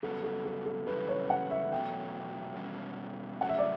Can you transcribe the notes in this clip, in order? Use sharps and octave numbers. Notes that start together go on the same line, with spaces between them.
F#2 C#3 G3 B3 F#4 A4
A4
A4
A4
F#2 C#3 E3 G3 B4
C#5
F#5
E5
E2 B2 F#3 A3 G5
E2 B2 G3 C#4
C#3 F#3 A3 C#4 F#5
E5
D5